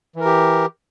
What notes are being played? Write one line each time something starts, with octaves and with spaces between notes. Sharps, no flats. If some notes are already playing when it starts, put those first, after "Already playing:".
E3 G4 A#4